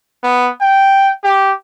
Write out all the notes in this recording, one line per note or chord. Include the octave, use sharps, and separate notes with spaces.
B3
G5
G4